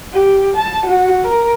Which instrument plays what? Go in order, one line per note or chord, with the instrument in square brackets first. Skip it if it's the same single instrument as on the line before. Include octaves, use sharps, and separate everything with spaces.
[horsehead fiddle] G4
A5
F#4
A#4